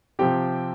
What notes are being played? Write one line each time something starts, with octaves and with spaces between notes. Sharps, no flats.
C3 F3 C4 G4 G5